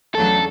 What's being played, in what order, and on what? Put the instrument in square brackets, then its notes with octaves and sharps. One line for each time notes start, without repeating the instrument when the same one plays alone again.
[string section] E2 C#3 F#3 A3 D4 [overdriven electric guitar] A4